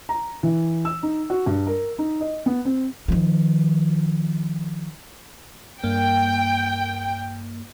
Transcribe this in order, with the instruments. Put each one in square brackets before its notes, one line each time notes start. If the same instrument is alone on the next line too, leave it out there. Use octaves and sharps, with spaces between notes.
[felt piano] A#5
E3
E6
D#4
F#4
G2
A#4
D#4
D#5
B3
C4
[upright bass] D#3 F3
[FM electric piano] G2 A#3 [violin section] G5